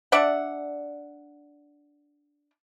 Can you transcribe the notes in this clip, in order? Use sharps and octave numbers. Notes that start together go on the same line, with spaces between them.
D4 D5 E5 F#5